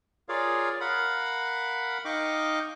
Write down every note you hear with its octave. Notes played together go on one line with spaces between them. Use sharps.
F4 G#4 A#4 C#5 D5 F5
A#4 F5 F#5 B5
D#4 D#5 F5 G5 C#6 D6